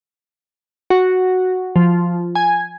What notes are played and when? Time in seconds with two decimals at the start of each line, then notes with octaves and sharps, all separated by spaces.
0.90 F#4
1.76 F3
2.35 G#5